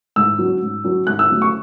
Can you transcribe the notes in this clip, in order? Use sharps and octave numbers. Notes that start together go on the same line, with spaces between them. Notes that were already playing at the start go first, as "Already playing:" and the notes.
G#2 E6
F#3
C#4
G#2
F#3 C#4
G#2 F#6
E6
F#3 A3 C#4
C#6